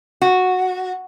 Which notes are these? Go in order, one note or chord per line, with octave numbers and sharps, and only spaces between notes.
F#4